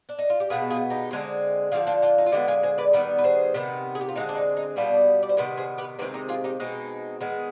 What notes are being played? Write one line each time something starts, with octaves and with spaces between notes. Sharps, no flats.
D4
D#4
F4
G4
B2 G#3 B3 F4 G#4
F4 G#4
D#4 G4
D3 G#3 C4
D3 F3 G#3 F4 G#4
D4 F4
D4 F4
D#4
F4
D3 G#3 B3 D#4 G4
F4 G#4
G#4 C5
B4 D5
D#3 G3 B3 B4 D5
B4
G#4 C5
C3 D#3 B3
G#4
G4
F4
D3 G#3 C4 D#4
D4
D#4
D#4
B2 G3 B3 D4 F4
D5
C5
C3 D#3 B3 G4 B4
G#4 C5
G4 B4
C3 D#3 G#3 C4 G4 B4
D#4 G4
F4 G#4
D#4 G4
B2 G#3 C4 D#4
D#3 G#3 B3